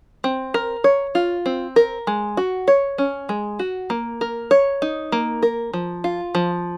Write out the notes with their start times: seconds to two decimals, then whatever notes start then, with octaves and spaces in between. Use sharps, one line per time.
0.24 C4
0.54 A#4
0.84 C#5
1.15 F4
1.46 C4
1.76 A#4
2.07 G#3
2.37 F#4
2.68 C#5
2.98 C#4
3.29 G#3
3.59 F#4
3.90 A#3
4.21 A#4
4.51 C#5
4.82 D#4
5.12 A#3
5.43 A#4
5.73 F3
6.04 F4
6.35 F3